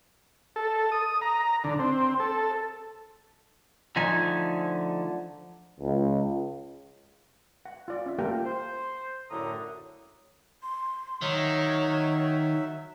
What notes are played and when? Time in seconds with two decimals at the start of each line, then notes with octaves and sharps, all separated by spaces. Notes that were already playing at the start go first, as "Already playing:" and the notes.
0.56 A4
0.92 D#6
1.21 A#5
1.64 D3
1.79 C4
2.19 A4
3.96 D3 F3 A3 D#4 G#5
5.80 C#2
7.65 F#5
7.88 F4 D5
8.06 C#4 E5
8.19 A#3 F4 G4 A4 A#4 G5
8.44 C5
9.30 F#2 A2 D3 A#5 D#6
10.63 C6
11.21 D#3 F#3 C#5 E5